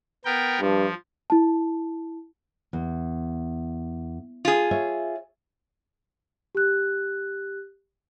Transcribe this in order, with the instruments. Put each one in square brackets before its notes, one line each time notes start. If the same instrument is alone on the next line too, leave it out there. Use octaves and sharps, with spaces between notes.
[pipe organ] B3 A#4 G5
[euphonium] G2 [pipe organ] F3
[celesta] E4 A5
[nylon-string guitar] E2
[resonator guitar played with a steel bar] F4 G#4
[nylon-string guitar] C#5 E5
[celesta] G4 F#6